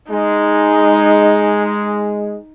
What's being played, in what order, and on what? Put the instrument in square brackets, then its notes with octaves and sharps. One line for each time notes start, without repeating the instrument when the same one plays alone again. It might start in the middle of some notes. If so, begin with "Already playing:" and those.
[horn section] G#3 [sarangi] D#4